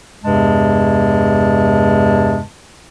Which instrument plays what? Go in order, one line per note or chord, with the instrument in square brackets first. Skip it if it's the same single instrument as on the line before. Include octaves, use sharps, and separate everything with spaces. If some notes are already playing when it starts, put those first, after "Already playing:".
[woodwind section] E2 G2 C3 G#3 A5